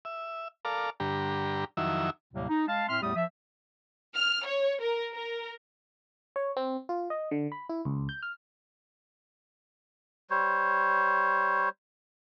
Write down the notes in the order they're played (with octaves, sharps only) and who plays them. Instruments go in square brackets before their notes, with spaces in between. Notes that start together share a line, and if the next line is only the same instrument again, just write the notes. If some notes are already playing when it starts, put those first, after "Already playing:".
[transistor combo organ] E5
A4 A#4 D5 F5
G2 D3 G4 A#5
F2 D#3 F#3 E4 E5
[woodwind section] D#2 A2 C3 F#3 G3 A#3
D#4
G#3 F5 A5
A2 C4 E5 C6 F6
E2 A2 G3 A3 G4 D#6
F3 E5
[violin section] F6
C#5
A#4
A#4
[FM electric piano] C#5
C4
F4
D#5
D3
B5
E4
C#2
G6
F6
[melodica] G3 C5 C#5